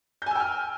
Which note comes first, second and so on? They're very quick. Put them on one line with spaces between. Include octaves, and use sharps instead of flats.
G6 G#5 E6 G5 F6